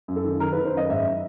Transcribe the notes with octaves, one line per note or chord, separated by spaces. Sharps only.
F#2
A4
D#3
D#3 A#4
B4
D#3
C5
F#2 D#5
G#2 E5